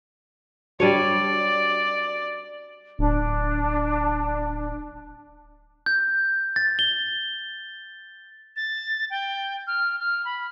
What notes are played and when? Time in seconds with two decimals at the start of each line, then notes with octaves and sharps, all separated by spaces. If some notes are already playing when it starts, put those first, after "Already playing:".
0.80 G3 D4 F#4 G4 C#5 D5 D#7
2.99 D1 D4
5.86 G6
6.56 A6
6.79 G7
8.56 A6
9.10 G5
9.67 F6
10.00 F6
10.25 B5